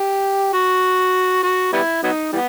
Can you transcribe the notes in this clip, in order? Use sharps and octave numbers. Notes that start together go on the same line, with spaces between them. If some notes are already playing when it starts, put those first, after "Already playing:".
Already playing: G4
F#4
F#4
G3 B3 E4
F#3 B3 D#4
E3 G3 B3